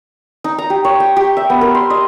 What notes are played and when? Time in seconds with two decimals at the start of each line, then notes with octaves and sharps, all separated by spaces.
0.44 D#4
0.58 A#5
0.70 G4
0.85 C#5
1.00 G5
1.17 G4
1.37 E5
1.50 B3
1.61 A#4
1.75 C6
1.90 D#5